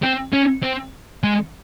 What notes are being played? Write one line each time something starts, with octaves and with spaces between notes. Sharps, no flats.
C4
C#4
C4
G#3